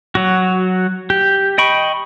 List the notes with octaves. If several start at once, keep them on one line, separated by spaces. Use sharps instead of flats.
F#3 F#4
G4
D#5 G5 B5 C#6